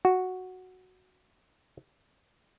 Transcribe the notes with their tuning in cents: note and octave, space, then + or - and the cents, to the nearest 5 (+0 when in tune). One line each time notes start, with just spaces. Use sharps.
F#4 +0